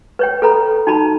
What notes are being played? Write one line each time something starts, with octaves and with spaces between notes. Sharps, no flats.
B4 C#5 G5
A4 B4 A#5 B5
D#4 F#4 A5 B5